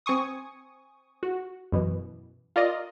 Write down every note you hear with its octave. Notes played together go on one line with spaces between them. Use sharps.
C4 G#5 C#6 D#6
F#4
F#2 B2 E3
F4 A#4 D5 D#5